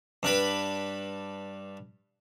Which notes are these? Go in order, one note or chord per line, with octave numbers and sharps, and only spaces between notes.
G2 D4 B4 B5